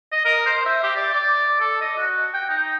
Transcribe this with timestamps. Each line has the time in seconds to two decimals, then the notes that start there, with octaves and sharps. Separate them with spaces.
0.12 D#5
0.25 A#4
0.46 C5
0.66 E5
0.83 G4
0.96 D5
1.13 D5
1.60 A4
1.81 D#5
1.98 F#4
2.34 G5
2.49 D#4